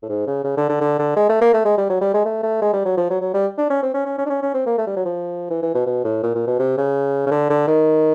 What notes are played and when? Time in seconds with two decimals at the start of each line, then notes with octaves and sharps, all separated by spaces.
0.03 A2
0.09 G#2
0.27 C#3
0.44 C#3
0.57 D3
0.69 D3
0.81 D3
0.99 D3
1.16 G#3
1.29 A3
1.41 A#3
1.54 A3
1.65 G#3
1.78 G3
1.90 F#3
2.01 G3
2.14 G#3
2.25 A3
2.43 A3
2.62 G#3
2.73 G3
2.85 F#3
2.97 F3
3.10 F#3
3.21 F#3
3.34 G3
3.58 D4
3.70 C#4
3.83 C4
3.94 C#4
4.06 C#4
4.18 C#4
4.26 D4
4.30 C#4
4.42 C#4
4.54 C4
4.66 A#3
4.78 A3
4.87 G3
4.96 F#3
5.05 F3
5.50 E3
5.63 E3
5.75 B2
5.87 B2
6.04 A2
6.23 A#2
6.35 A#2
6.47 B2
6.59 C3
6.77 C#3
7.27 C#3
7.31 D3
7.50 D3
7.68 D#3